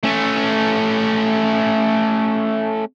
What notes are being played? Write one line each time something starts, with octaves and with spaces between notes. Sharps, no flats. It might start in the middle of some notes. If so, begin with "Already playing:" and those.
A3 C#4